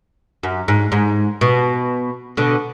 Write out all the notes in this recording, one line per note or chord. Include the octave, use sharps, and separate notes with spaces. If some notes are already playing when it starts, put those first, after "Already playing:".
F#2
G#2
G#2
B2
B2 D3